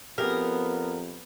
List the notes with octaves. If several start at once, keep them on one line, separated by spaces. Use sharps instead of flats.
F2 B3 G4 G#4 A#4